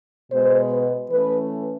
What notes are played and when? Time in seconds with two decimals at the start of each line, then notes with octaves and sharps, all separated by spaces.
0.32 B2 G#3 B3 C5
0.71 B4
1.10 E3 A3 C#4 B4